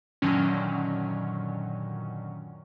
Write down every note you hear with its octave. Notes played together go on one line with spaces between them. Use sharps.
F#2 A#2 D3 D#3 F#3 C#4